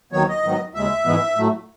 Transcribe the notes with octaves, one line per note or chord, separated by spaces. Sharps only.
D#2 D#3 F#3 B3 C#5
D#5
G#2 D#3 F#3 B3
D#2 C#3 G#3 E5
G#2 E3 G#3 B3
A2 F#3 A3